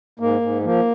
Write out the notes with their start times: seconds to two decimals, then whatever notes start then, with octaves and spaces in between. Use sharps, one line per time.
0.19 G#2 A#3
0.41 G#2
0.62 F3 A#3